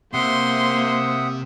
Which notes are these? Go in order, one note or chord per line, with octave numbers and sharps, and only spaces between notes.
C3 A#3 C5 E5 F#5 C6 D#6